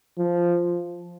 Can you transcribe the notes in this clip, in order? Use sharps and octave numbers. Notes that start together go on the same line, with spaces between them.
F3